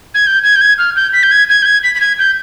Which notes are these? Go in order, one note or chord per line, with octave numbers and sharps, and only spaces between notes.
G#6
G6
G#6
G6
G#6
F6
G6
B6
G6
G#6
G#6
G6
G#6
B6
B6
G#6
G6